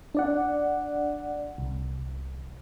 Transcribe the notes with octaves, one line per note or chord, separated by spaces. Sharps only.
D4 D5 F#5
C2